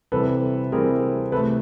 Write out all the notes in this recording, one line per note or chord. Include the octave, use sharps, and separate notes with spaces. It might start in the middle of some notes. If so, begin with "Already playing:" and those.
C3 E3 G3 C4 A4 B4
C3 E3 G3 C4 G#4 A#4
C3 E3 A3 A4 B4